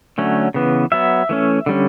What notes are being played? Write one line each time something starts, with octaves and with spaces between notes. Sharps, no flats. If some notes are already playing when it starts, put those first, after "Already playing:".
D3 F#3 A3 C#4
C#3 E3 B3
F#3 B3 E5
E3 A3 C#4
D3 G3 C#4